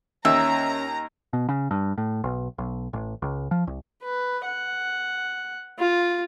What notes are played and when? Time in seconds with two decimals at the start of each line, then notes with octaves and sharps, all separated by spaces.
0.25 D#2 C#4 E5 A#5
1.33 B2
1.49 C#3
1.71 G2
1.98 A2
2.24 B1
2.58 B1
2.93 A1
3.22 C#2
3.51 F3
3.67 C2
4.03 B4
4.46 F#5
5.79 F4